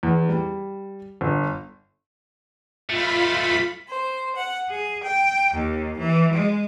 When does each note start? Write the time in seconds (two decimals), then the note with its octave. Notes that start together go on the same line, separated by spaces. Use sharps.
0.03 E2
0.29 G3
1.21 G1
2.90 B1 A3 F4 B5
3.88 C5
4.36 F#5
4.69 G#4
5.03 G5
5.52 D#2
5.98 E3
6.32 G#3